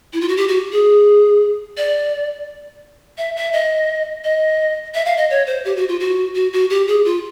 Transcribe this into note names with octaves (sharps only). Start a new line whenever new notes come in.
E4
F4
F#4
G4
F#4
G#4
D5
E5
E5
D#5
D#5
E5
F5
D#5
C#5
C5
G4
F#4
F4
F#4
F#4
F#4
G4
G#4
F4